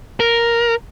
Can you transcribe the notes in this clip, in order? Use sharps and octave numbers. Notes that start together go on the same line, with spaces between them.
A#4